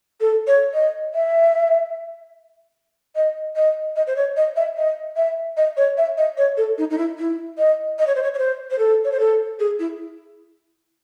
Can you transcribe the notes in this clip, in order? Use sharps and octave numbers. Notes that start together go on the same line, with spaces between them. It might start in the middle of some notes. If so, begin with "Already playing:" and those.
A4
C#5
D#5
E5
D#5
D#5
D#5
C5
C#5
D#5
E5
D#5
E5
D#5
C#5
E5
D#5
C#5
A4
D#4
D#4
E4
E4
D#5
D#5
C#5
C5
C#5
C#5
C5
C5
A4
C#5
C5
A4
G#4
E4